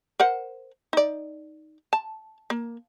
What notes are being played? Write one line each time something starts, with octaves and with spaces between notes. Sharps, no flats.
A#4 C5 F#5
D#4 D5
A5
A#3